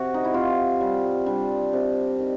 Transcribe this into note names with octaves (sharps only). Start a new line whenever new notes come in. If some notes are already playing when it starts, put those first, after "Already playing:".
Already playing: C3 F#4
D#4
E4
C3 F4
G3
G3 D4
C3
D#3